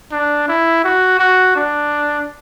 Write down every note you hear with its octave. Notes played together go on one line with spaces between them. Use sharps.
D4
E4
F#4
F#4
D4